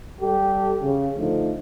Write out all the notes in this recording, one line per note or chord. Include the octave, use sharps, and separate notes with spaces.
G3 G4 A4
C#3
D3 F3 A3 D#4